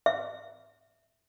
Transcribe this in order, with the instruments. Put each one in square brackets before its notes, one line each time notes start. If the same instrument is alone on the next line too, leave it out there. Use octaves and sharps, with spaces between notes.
[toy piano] E5